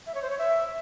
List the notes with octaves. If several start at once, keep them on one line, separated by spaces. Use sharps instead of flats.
E5
C#5
C5
C#5
E5